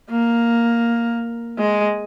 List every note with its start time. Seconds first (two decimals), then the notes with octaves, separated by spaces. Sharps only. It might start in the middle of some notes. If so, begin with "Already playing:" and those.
0.11 A#3
1.58 G#3